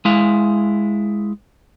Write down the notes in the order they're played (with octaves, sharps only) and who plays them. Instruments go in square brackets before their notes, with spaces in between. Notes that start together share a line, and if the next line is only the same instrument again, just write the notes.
[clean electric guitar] G#3 E4 F5